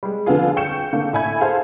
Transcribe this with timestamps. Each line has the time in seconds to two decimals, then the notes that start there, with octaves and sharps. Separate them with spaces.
0.03 G3 G#3
0.26 D3 F3 B3 F4 G#4
0.56 G5 C#6 G6 C#7 E7
0.93 D3 A#3
1.13 A2 E5 G#5 B5 G#6
1.41 G#4 A4 C5 F5